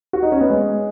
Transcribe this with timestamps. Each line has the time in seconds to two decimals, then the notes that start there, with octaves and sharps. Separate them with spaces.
0.13 F#4
0.23 D#4
0.32 C#4
0.41 B3
0.50 G#3